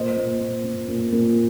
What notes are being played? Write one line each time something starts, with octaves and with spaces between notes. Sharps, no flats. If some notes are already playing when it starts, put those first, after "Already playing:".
Already playing: A#2 C5 D#5
A#2
A#2
A#2
A#2
A#2